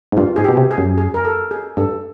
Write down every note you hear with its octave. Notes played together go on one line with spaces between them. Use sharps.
G#2
G2 F4
G#2 G#4
B2 G4
C3
G#4
F#2
G#4
A#4
A4
G#4
G2 A4